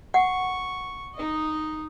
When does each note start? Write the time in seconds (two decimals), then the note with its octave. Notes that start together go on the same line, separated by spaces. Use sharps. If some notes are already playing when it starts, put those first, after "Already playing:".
0.14 F#5 C#6
1.14 D#4 D#5